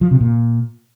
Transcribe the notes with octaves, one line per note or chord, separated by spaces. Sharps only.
F3
C3
A#2